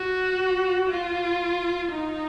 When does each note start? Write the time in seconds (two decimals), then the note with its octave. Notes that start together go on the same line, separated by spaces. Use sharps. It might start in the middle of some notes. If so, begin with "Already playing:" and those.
Already playing: F#4
0.88 F4
1.92 D#4